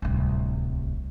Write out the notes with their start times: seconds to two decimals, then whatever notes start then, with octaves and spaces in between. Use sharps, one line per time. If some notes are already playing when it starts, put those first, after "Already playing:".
0.02 D1 C2